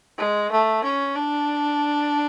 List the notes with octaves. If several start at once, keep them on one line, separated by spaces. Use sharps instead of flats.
G#3
A3
C#4
D4